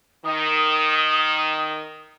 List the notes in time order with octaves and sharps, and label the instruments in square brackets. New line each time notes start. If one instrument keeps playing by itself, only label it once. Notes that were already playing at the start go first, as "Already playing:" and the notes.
[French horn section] D#3 [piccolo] D#6